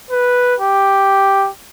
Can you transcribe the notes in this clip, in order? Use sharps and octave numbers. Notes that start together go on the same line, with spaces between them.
B4
G4